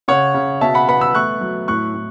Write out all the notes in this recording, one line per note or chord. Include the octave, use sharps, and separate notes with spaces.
C#3 C#5 F#5
C#3
B2 E5 A5
F#5 B5
B3 F#5 B5
B5 E6
A3 C#6 F#6
F#3
A2 C#6 F#6
A2